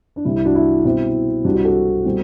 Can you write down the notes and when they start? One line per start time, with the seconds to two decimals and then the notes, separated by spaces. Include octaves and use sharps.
0.16 D4
0.25 C2 C3 G3 E4
0.35 E4
0.45 D4 F#4
0.55 E4
0.84 B2 G3 C4 E4
1.44 C2 C3 G3 C4 D4 F#4
1.55 D4 F#4
1.65 F#4 A4
2.05 B2 G3 C4